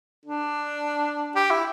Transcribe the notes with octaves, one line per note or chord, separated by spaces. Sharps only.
D4
G4
E4